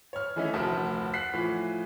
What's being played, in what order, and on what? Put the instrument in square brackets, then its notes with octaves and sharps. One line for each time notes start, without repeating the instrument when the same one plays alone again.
[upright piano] C#5 F6
D#3 E3 A3 C#4 D#4 E4
F1 D2 A#4 A5 B5 D#6
F#5 F#6 B6 C7
A2 E3 F3